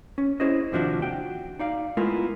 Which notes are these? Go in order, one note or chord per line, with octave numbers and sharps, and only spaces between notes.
C#4
C#4 E4 G#4 C5 D#5
D#2 C3 F3 D4 F#4 E5
F#4 G5
D#4 D5 F5
G#3 A3 B3 E4 F4 A#4